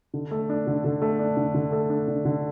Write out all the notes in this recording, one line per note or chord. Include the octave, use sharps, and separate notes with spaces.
D3
A3
D4
D3
D3
A3
D4
D3
D3
A3
D4
D3
D3